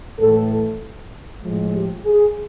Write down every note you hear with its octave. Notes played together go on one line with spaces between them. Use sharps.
A2 E3 A3 A4
A2 F3 G#3
G4
G#4